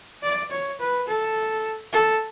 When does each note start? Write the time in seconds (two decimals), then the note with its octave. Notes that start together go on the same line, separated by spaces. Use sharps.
0.23 D5
0.51 C#5
0.80 B4
1.08 A4
1.93 A4